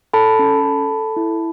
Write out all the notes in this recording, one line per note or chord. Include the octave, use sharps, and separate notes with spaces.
A4 A5 B5
C#4
A4
A4
E4